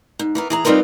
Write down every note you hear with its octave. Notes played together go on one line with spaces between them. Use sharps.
G#2
E3 B3 A#4
E3 G#4 A#5
G3 C4 D#4 F4 A#4 B4